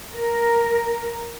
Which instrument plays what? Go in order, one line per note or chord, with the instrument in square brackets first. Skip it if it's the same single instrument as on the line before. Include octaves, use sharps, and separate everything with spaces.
[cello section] A#4